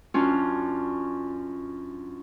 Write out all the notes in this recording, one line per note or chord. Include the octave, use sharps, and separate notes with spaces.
F#2 C#4 D4 F4